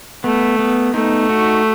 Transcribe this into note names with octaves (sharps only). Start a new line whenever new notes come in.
A3 B3
B3
A3 D#4
F#4